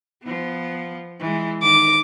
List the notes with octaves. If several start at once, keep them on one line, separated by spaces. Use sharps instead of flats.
F3 B3
E3 G#3
D#3 D6